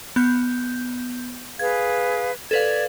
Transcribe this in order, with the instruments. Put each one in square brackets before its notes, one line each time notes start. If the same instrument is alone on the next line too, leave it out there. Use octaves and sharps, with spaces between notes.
[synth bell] B3 G6
[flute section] G#4 B4 F5 [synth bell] G#6
[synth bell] A4 B4 F5 [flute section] D5 G#6